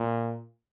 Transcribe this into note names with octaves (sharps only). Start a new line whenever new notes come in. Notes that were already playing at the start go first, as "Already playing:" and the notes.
Already playing: A#2